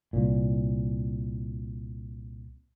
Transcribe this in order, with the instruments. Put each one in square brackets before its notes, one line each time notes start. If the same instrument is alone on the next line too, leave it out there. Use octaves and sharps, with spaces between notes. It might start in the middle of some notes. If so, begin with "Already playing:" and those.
[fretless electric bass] C2 A#2